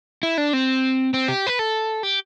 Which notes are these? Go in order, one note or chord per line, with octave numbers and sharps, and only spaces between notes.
E4
D4
C4
C4
G4
B4
A4
G4